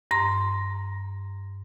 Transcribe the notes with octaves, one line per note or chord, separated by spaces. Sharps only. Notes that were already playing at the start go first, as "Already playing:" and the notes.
G2 A#5 C6